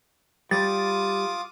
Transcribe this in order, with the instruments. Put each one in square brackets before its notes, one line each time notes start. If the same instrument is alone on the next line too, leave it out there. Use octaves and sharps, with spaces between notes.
[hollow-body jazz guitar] G3 [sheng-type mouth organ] F4 D6 D#6 [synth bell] A6